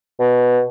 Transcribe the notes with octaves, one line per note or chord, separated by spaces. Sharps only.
B2